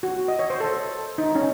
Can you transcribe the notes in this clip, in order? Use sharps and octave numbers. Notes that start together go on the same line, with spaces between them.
F#4
D#5
C#5
C5
A4
D#4
C#4